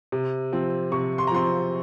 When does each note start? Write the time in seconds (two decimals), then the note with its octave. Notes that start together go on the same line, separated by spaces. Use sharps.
0.12 C3
0.52 F3 C4
0.92 C3 C#6
1.18 C6
1.27 A#5
1.31 F3 C4 C6